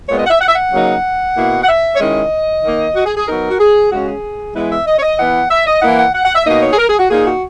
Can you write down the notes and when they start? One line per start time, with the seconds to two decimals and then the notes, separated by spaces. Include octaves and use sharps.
0.09 A#2 G#3 B3 C#5
0.19 D#5
0.26 F#5
0.30 E5
0.41 F#5
0.48 E5
0.56 F#5
0.73 C#3 F#3 A#3 D#4
1.36 B2 A#3 E4
1.64 F#5
1.69 E5
1.95 C#5
2.00 D#3 G#3 C#4 E4 D#5
2.64 D#3 A#3 D#4
2.96 F#4
3.06 G#4
3.17 G#4
3.28 F#3 B3 D#4 A#4
3.50 F#4
3.60 G#4
3.92 C#3 G#3 C#4 F#4
4.07 G#4
4.54 E3 G#3 B3 E4 B4
4.71 E5
4.87 D#5
4.98 C#5
5.03 D#5
5.19 E3 B3 E4 F#5
5.51 E5
5.67 D#5
5.82 E3 A#3 E4 F#5
5.99 F#5
6.15 F#5
6.25 F#5
6.35 E5
6.46 B2 A#3 D#4 D#5
6.62 C#5
6.73 G#4
6.78 A#4
6.89 G#4
6.99 F#4
7.10 A#2 A#3 D#4 G#4
7.27 F#4